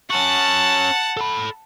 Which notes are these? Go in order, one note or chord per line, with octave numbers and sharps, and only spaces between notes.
C#4 F#4 F#5 A5
A4 B5